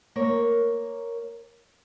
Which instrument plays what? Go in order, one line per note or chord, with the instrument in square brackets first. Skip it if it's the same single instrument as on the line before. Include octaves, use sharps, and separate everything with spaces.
[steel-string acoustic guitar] A#3 A#4 C#5